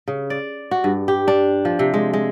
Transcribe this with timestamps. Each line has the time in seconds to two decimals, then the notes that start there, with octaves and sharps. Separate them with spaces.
0.08 C#3
0.30 D5
0.71 F#4
0.84 G2
1.08 G4
1.28 D4
1.65 F3
1.79 C3
1.94 G#3
2.13 G#3